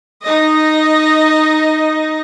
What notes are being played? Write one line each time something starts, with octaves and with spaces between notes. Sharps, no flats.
D#4 D#5